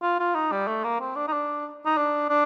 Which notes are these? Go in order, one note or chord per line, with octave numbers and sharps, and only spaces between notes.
F4
F4
D#4
G3
A3
A#3
C4
D4
D#4
D4
D#4
D4
D4